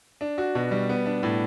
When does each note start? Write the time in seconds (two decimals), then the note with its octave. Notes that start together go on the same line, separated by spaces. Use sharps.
0.21 D4
0.38 F#4
0.55 B2
0.71 G3
0.89 B3
1.06 D4
1.23 A2